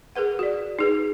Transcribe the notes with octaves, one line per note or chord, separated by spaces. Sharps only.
G#4 A#4 B4 F#5
F#4 D5
D#4 G#4 B4